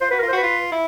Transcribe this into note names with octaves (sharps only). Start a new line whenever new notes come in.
F4 C5
F#4 B4
A#4
F4
C5
F#4 B4
F4
E4